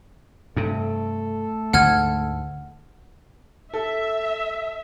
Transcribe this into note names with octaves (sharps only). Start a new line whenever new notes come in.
G2 C3 A3 A4
D2 G#2 D3 F#5 F6 G#6
A4 E5